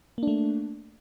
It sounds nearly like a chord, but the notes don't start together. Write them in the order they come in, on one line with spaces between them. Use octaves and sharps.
A#3 D4 A3